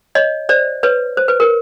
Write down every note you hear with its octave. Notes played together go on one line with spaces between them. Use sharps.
C#5 D#5
C5 D5
B4 C#5
C5
B4
A#4